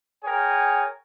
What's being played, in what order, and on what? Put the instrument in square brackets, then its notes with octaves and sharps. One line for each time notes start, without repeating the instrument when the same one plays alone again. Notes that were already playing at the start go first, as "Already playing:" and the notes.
[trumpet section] G#4 A#4 C#5 G5 G#5